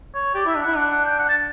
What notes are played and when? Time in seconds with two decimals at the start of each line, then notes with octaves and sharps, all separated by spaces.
0.15 C#5
0.35 G4 D5
0.46 E4
0.49 E5
0.56 D4
0.62 E4 F#5
0.77 D4 F#5
0.91 F#5
1.05 G5
1.19 F#5
1.29 A5